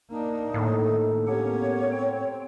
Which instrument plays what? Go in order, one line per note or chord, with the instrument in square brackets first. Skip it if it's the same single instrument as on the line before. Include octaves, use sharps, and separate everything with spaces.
[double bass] A#3 D4 [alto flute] D#4
[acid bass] A2 [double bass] D#3 [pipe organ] A#3 D4 A4
[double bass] A#3 C#4 [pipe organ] B3 G4 F#5 [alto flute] C#5
[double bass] C4 [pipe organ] G5